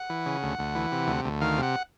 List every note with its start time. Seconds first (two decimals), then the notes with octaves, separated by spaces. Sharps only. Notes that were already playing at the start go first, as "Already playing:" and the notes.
Already playing: F#5
0.10 E3
0.26 C#3
0.43 D2
0.59 D2
0.75 E3
0.92 C3
1.08 D2
1.25 D2
1.41 D#3 F5
1.58 C3 F#5